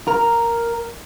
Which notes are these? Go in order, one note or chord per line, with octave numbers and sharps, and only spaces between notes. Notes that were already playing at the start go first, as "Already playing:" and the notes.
A#4